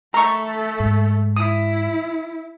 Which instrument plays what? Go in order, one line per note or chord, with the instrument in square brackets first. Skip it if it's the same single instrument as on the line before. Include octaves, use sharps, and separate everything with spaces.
[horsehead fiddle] A3 A4 [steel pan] A#5 C#6
[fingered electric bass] G#2
[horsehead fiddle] E4 [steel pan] D#6